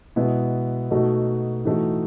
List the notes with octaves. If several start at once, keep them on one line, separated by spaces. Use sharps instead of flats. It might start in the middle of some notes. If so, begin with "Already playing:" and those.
B2 G#3 B3 E4
B2 A3 D#4 F#4
A2 E3 A3 D#4 F#4